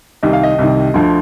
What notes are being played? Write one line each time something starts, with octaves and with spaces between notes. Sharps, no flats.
C2 C3 D#3 D#5
F5
D#5
C2 C3 D#3
D2 D3 F3